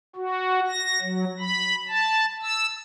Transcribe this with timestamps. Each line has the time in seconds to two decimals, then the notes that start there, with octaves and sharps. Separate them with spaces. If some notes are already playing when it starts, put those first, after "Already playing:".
0.16 F#4
0.68 A#6
1.01 F#3
1.40 B5
1.88 A5
2.42 E6